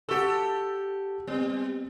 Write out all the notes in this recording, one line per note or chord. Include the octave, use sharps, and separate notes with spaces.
G4 A4 F#5 C#6 E6
G3 B3 C4